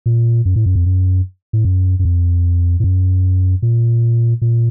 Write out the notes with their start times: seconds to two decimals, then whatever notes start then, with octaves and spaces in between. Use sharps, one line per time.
0.06 A#2
0.45 F#2
0.56 A2
0.66 F#2
0.75 F2
0.86 F#2
1.53 A2
1.65 F#2
1.99 F#2
2.05 F2
2.80 A2
2.84 F#2
3.62 A#2
4.42 A#2